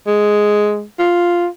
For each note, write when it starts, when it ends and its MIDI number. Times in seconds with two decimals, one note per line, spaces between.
0.07 0.83 56
0.99 1.47 65